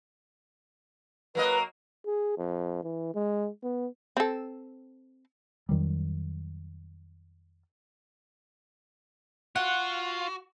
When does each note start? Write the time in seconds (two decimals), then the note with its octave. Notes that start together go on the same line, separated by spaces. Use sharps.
1.35 F#3 A#3 B4 D#5
2.06 G#4
2.37 F2
2.83 E3
3.14 G#3
3.63 B3
4.17 C4 A4
5.69 F2 D#3 F#3 G3
9.56 F4 F#4 F#5